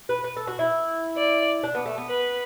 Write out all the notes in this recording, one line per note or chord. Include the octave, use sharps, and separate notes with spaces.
B4
B4
A4
F#4
E4
D5
D4
B3
A3
B3
B4